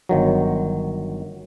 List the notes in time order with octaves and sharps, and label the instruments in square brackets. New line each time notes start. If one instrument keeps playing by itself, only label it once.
[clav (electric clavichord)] G1 D#3 F#3